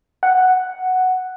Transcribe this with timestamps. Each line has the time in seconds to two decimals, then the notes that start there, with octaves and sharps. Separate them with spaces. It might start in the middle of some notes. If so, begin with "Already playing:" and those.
0.23 F#5